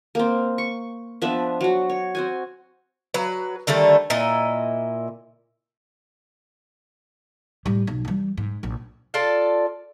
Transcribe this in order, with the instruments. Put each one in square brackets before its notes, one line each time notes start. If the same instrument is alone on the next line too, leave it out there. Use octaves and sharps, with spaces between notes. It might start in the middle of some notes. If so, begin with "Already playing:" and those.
[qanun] A#3 C4
C#6
F3 B3 D4 E5
F#3 F#4
C#5
C4 F#4 G#5
[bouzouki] F#3 B4
D3 D#3 G3 A3
A#2 E4 D#5
[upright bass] A2 G3
B1
E3 G3
G#2
A#1
[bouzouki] F4 A4 D5